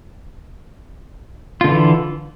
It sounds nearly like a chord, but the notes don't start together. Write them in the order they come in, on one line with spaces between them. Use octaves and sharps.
F4 D3 E3